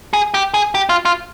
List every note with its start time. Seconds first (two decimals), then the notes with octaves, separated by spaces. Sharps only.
0.13 G#4
0.34 G4
0.54 G#4
0.75 G4
0.89 F4
1.05 F4